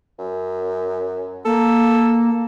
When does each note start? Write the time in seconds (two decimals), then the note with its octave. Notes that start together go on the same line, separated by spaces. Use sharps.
0.19 F#2
1.45 A#3 A4